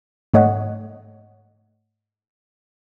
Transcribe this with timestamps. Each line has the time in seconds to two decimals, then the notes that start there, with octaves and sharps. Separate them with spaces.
0.34 G#2 A3 C#5 D#5 F#5